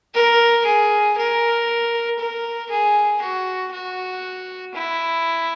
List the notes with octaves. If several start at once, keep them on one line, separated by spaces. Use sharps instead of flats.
A#4
G#4
A#4
A#4
G#4
F#4
F#4
E4